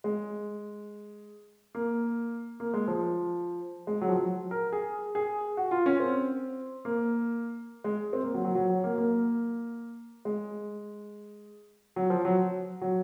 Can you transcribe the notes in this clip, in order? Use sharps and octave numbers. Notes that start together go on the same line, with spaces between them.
G#3
A#3
A#3
G#3
F3
G#3
F#3
F3
F#3
A#4
G#4
G#4
F#4
F4
C#4
C4
A#3
G#3
C4
A#3
F#3
F#3
F#3
F#3
A#3
A#3
G#3
F#3
F3
F#3
F#3